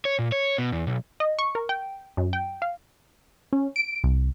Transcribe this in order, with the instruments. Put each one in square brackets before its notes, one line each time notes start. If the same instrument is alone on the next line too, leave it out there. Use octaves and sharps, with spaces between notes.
[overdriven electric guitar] C#5
A#2
C#5
B2
E2
B1
[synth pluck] D#5
C#6
A#4
G5
F#2
G5
F5
[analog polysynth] C#4
D7
C2